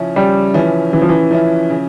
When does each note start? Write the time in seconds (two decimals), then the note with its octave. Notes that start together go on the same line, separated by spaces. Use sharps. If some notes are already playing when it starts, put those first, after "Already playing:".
Already playing: C#3 F3 C#4 E4
0.16 C#3 G3
0.54 E3 F3 C#4 E4
0.93 C#3 E3
1.02 F3
1.09 E3
1.31 F3 C#4 E4
1.70 C#3